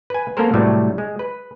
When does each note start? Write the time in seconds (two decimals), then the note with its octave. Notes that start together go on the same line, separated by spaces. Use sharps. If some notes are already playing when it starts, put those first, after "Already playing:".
0.10 B4 G#5
0.37 A#3 B3 C#4 A4 A#4 C5
0.54 A2 C3 F#3 G3 A3
0.98 G#3
1.19 B4